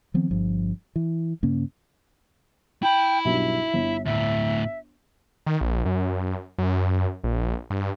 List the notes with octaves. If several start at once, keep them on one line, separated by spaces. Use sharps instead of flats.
D#3 F3 B3 C4
G1 G2 F3
E3
G2 C#3 A#3 C#4
E4 G5 B5
B1 G2 E5
G1
D2 A2 E5
D#3
A#1
F#2
F#2
A#1
G2